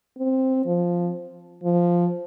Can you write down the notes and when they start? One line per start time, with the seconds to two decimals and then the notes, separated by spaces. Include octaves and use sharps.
0.18 C4
0.66 F3
1.63 F3